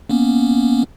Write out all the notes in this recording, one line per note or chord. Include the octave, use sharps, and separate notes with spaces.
A#3 B3 C#4